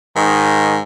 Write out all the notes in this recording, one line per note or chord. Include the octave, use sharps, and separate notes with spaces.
G#2 D#3